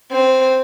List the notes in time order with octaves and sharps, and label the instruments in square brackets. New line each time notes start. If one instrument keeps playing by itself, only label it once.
[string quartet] C4